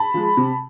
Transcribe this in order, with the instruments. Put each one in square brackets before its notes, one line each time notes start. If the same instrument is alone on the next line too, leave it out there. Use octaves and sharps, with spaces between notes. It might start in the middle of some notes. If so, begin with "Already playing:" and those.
Already playing: [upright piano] A5 B5
F3 G#3
C3